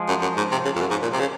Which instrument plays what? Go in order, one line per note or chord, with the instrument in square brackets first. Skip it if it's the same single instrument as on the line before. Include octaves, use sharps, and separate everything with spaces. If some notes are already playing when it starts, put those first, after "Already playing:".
Already playing: [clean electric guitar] F3 G#3
[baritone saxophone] F#2
F#2
G#2
C3
C#3
F2
F#2
G#2
A#2
C3
C#3